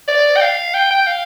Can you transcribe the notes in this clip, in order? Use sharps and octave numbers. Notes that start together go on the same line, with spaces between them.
D5
G5
F5
G5
G5
F5